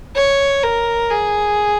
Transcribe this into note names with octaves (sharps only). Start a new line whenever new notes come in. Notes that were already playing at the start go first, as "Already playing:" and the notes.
C#5
A#4
G#4